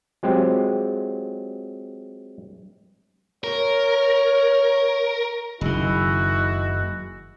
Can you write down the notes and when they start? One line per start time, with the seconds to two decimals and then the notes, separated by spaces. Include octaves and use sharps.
0.23 F#3 G#3 C4 F4 G4
3.44 A#4 C#5
5.61 F#1 D#3 G#3 E4 F#4